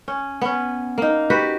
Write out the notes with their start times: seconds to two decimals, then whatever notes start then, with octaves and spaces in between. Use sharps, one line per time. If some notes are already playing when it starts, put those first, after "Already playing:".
0.08 C#4
0.41 B3 C#4
0.98 A#3 D#4
1.30 F#4 G4 B4